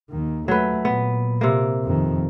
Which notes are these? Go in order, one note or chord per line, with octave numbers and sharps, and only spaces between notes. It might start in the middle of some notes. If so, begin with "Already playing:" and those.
D#2 D#3
F#3 A3 B4
A#2 B3
C3 A#3
F2 D#3